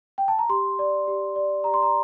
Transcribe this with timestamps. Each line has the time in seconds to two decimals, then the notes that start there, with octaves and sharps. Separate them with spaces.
0.18 G5
0.28 A5
0.39 A#5
0.49 G4 C6
0.79 D5
1.08 G4
1.36 D5
1.64 G4 A#5
1.74 C6
1.83 A#5